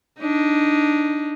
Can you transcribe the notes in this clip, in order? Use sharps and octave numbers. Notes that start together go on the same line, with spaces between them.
D4 D#4